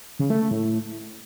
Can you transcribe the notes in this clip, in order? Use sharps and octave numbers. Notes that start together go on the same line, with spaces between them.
C#3
A3
A3
A2